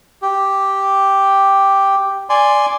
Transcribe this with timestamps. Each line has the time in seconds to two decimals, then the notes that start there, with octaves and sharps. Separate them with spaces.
0.22 G4
2.30 D5 G#5 C6